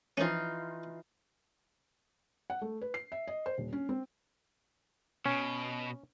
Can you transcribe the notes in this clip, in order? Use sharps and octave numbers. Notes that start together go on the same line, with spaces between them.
E3 F3 C#4 D#4 F4
F#5
A3
B4
C7
E5
D#5
C5
D#1
C#4
C4
B2 C#4